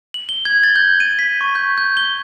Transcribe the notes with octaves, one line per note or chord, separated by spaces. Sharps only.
F#7
G7
G#6
A6
G6
D#7
B6
C#6
G6
G6
G7